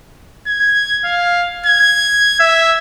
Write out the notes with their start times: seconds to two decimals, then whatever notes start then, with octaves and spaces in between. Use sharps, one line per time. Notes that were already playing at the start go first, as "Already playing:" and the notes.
0.47 G#6
1.05 F5
1.66 G#6
2.40 E5